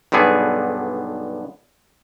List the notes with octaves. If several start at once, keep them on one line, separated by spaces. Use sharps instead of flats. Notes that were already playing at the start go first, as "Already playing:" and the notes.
B1 G2 D3 B3 G#4